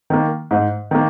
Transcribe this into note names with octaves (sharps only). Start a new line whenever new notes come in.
D#3 A#3
G#2
D#3 A#3